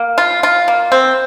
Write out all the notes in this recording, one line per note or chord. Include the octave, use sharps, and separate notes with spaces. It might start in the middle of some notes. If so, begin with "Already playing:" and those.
Already playing: A#3
F4
F4
A#3
C4